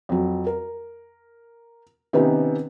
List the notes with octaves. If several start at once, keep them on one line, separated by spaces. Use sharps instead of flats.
F2 F#3
A#4
C3 D#3 B3 C#4 D#4